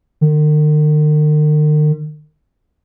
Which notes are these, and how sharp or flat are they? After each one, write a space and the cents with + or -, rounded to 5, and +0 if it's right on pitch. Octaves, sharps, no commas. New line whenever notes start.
D#3 -45